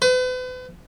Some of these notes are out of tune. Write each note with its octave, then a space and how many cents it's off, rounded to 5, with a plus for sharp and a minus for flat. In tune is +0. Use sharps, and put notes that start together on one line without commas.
B4 +40